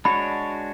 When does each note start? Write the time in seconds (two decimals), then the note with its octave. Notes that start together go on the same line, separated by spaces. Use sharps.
0.05 G#3 D4 F#4 C#5 B5